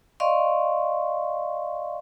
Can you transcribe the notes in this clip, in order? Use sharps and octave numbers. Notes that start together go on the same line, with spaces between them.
D5 D#5 F5 C6 C#6